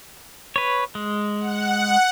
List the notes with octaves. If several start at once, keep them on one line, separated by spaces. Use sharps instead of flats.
B4 C#5
G#3
F#5